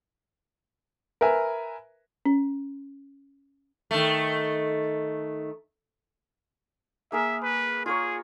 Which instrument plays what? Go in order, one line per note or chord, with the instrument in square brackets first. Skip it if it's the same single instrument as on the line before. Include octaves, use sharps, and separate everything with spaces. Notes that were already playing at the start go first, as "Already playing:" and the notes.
[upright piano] A#4 B4 E5 G#5
[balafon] C#4
[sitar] D#3 A3
[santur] A#3 G#4 A#4 [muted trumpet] E5
[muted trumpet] B4
[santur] F4 A#4 C#5 [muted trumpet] G#4